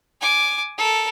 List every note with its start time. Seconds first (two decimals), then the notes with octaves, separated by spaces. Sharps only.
0.21 G#5 D6
0.78 A4 A#4